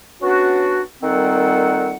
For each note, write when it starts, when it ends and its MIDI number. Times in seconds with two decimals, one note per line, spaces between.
0.22 0.80 59
0.22 0.80 61
0.22 0.80 62
0.22 0.80 66
1.03 1.95 46
1.03 1.95 51
1.03 1.95 55
1.03 1.95 60
1.03 1.95 69
1.03 1.95 78